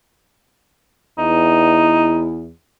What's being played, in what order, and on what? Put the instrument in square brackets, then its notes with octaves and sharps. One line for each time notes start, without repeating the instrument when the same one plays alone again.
[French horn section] E2 E4 [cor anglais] D#4